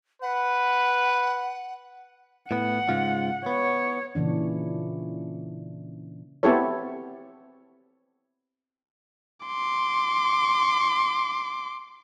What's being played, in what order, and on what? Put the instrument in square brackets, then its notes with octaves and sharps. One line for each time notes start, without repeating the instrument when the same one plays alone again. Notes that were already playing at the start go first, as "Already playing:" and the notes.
[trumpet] B4 [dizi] F#5
[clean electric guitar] A2 B3 [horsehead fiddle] F#5
[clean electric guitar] G#2 C#3 F4
[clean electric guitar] B3 [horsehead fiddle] C#5
[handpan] A#2 C#3 E3 D4
[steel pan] B3 C4 E4 G4 A4 C#5
[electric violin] C6 D6